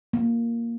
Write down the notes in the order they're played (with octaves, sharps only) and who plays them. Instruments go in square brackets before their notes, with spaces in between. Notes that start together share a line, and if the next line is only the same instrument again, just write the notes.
[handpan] A#3